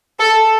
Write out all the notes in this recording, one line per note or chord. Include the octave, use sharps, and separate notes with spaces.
A4